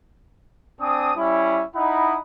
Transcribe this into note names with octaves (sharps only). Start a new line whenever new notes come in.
C4 D4 G#5 D#6
G3 C#4 E4
D#4 E4 D#5 F#5 B5